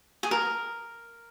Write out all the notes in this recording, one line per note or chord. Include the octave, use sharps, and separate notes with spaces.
G#4
A#4